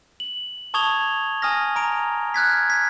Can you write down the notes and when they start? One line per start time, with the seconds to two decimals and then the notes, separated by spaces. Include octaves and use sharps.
0.20 F#7
0.74 A5 C#6 D#6 G#6 F7 G7
1.42 G#5 D#6 F6 A#6
1.76 A#5 D7
2.34 F6 F#6 G#6 B6
2.70 G#6 B6